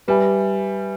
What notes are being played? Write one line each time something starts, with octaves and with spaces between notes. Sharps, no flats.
G3 B4 E5 G#5 B5